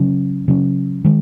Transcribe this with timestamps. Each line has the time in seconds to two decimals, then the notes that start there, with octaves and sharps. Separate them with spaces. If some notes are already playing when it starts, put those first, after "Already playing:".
Already playing: C#3 F#3 C#4
0.48 C#3 F#3 C#4
1.04 D#3 G#3